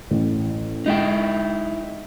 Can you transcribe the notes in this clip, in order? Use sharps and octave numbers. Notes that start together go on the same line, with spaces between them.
A1
G#3 D#4 E4 G5